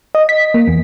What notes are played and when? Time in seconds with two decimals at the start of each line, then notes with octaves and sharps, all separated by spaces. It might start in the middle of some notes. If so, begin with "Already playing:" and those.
0.15 D#5
0.29 B6
0.54 A#3
0.68 E2